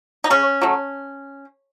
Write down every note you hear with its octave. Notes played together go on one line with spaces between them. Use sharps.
D#4
C#3 C#4
F#3 A3